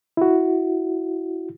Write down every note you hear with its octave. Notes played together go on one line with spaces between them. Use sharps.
E4 F#4